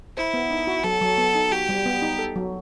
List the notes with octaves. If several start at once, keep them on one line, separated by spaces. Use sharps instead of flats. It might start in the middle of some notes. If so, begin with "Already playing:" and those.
E4 C5
B3
D#4
F#4
F#3 A4
F#3
B3
D#4
F#4 G4
G3
B3
D#4
A4
F#3